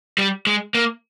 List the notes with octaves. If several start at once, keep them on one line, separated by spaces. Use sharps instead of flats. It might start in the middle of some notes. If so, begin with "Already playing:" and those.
G3
G#3
A#3